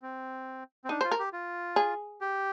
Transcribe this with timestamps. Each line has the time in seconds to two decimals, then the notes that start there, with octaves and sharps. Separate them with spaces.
0.02 C4
0.85 C4
0.89 D4 D#4
1.01 F4 C5
1.11 A#4
1.19 G4
1.33 F4
1.76 G#4
2.21 G4